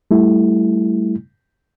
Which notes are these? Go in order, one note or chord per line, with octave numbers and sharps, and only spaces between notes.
G3 A3 E4